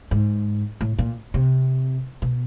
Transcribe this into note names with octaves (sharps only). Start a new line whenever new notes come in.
G#2
A2
A#2
C3
B2